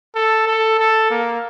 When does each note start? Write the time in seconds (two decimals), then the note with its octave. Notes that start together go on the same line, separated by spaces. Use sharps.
0.15 A4
0.47 A4
0.79 A4
1.10 A#3